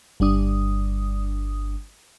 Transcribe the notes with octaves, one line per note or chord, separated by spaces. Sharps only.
G1 G3 D4 D#6